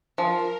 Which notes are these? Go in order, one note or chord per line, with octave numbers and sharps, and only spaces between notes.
F3 A#4